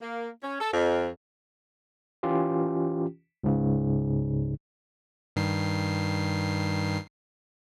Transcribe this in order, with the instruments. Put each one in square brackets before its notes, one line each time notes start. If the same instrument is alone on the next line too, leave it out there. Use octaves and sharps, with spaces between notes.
[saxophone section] A#3
C#4
A4
F2
[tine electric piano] E3 C#4 F4 G4
C#2 G#2 C#3
[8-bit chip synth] G2 D#3 C7